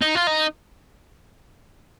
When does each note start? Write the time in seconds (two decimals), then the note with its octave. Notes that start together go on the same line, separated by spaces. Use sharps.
0.01 D#4
0.15 F4
0.27 D#4